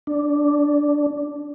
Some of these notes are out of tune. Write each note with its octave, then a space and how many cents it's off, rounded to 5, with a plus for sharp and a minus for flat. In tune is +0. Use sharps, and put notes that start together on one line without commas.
D4 -5